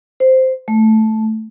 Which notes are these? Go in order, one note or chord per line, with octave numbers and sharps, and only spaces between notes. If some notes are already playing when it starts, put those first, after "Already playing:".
C5
A3